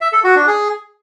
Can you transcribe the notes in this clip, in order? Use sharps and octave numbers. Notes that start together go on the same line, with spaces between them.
E5
A4
F#4
D4
G#4